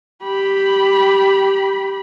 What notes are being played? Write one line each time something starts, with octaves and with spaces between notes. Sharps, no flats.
G4 B5